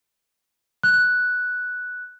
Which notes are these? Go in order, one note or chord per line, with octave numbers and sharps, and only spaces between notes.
F#6